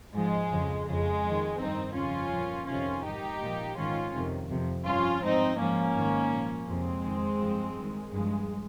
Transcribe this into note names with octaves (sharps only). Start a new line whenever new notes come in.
G#2 F3 G#3
F2 C#3 F3
F2 C#3 F3 G#3
F2 D#3
G2 D#3 C4 D#4
F2 C#3 F3 C#4 F4
A#2 F3
F2 C3 D#3 C#4 F4
G#2 D#3 D#4 G4
A#2 F3
G#2 D#3 C#4 F4
F2 C3 D#3
F2 C3 F3
G2 F3 C#4 F4
G#2 F3 C4 D#4
G#2 F3 A#3 C#4
G#2 D#3
A#2 F3
F2 C3 F3 G#3 C4
F2 D#3
G2 F3
G2 D#3
G2 F3 G#3